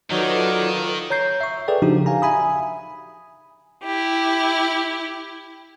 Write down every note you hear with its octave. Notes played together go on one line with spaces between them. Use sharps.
D#3 F#3 D#4 F4 A4 B4 C#5 D5
C#5 A#5 G6 C7
E5 C#6
G#4 A4 B4 D5 G5
C#3 F3 D4 D#4 F#4 G4
F5 G#5 A#5
E5 G#5 B5 D#6
E4 G4